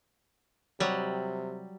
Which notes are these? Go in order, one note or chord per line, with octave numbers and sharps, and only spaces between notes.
C3 F#3 G3